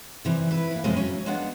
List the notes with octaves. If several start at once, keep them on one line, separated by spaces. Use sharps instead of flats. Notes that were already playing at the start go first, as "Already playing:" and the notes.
C3 E3 G3
E4 B4
E3 A#3
F2 A2 C3 G3 G#3 A#3
F#3 C#4
G#3 A#3 B3 D4 F#5